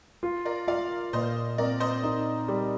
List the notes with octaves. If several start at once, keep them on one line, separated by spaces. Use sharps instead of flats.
F4
A#4 D5
F4 D5 F5
A#2 C5 D#5
C4 A#4 D5
C5 D#5
D#4
G3